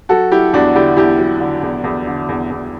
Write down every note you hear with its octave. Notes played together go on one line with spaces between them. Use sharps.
F#3 F#4 A4
F#3 E4 G4
E2 D4 F#4
D3 E4 G4
E2 E4 G4
F#3
D3
E2
E2
D3
E2
E2